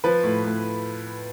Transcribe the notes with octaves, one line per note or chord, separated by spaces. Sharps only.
F3 B4
A2
A2